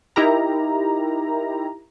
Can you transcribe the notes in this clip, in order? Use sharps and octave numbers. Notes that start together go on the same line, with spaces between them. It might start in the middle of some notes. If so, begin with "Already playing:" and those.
D#4 E4 G4 A#4 A#5